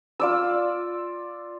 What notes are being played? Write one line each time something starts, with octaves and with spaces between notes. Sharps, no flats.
F4 D5 E6